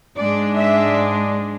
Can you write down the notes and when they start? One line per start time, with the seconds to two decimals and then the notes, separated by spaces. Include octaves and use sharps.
0.17 G#2 G#3 D4 D5
0.57 E5